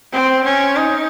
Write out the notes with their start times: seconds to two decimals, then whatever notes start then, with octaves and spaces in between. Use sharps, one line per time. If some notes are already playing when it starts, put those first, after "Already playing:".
0.13 C4
0.44 C#4
0.76 D#4